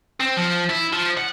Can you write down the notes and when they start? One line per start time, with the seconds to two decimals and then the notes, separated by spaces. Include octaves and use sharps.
0.20 C4
0.37 F3
0.70 E4
0.93 F3
1.18 F#5